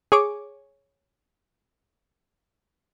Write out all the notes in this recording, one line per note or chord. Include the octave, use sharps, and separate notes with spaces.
G#4 C#5 D6